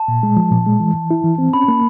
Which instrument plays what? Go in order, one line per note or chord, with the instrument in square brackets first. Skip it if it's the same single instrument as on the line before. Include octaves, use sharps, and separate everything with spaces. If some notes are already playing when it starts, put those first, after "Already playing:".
Already playing: [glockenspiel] A5
[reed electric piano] A#2
G#3
F3
A#2
G#3
E3
E3
E4
E3
C4
[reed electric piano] C#4 [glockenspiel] B5
[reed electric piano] A#3